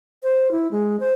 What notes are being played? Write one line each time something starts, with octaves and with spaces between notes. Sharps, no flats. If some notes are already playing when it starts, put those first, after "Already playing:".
C5
E4
G#3
C5